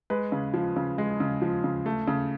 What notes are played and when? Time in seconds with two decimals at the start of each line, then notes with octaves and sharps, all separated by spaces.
0.10 G#3 B4
0.32 C#3
0.54 F3
0.76 C#3
0.98 G#3
1.20 C#3
1.42 F3
1.64 C#3
1.86 A3
2.08 C#3